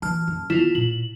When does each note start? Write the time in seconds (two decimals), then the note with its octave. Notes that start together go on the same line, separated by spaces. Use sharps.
0.02 E3 A5 F6
0.27 F#2
0.50 D#3 B3 E4 F4
0.75 A#2 F#7